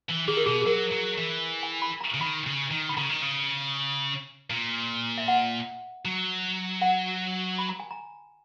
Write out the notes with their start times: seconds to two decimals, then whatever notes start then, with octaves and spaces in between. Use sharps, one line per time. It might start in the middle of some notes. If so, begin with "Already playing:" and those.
0.10 E3
0.28 D#3 G#4
0.37 A#4
0.46 B2 G#4
0.62 G#4
0.66 F#3 A#4
0.92 F#3
1.18 E3
1.63 G#5
1.82 B5
2.01 A#5
2.14 C#3
2.20 D#3 B5
2.47 C#3
2.71 D#3
2.89 B5
2.97 C#3 A#5
3.09 D#3
3.22 C#3
4.50 A#2
5.18 E5
5.28 F#5
6.05 F#3
6.82 F#5
7.59 B5
7.69 A#5
7.80 G#5
7.91 A#5